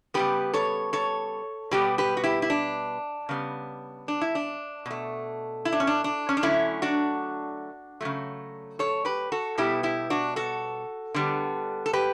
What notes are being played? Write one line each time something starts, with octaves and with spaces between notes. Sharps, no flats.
C#3 G3 B3 G4 B4
A4 C#5
A4 C#5
B2 G3 B3 G4 B4
G4 B4
F#4
E4 G4
E4
D4
C#3 G3 B3
D4
E4
D4
B2 A3
E4
D4
C#4
D4
D4
C#4
D4
D3 F#3 A3 C#4 E4
D4 F#4
C#3 F#3 A3
A4 C#5
G4 B4
F#4 A4
B2 G3 B3 E4 G4
E4 G4
D4 F#4
F#4 A4
D3 G3 B3
A4
G4 B4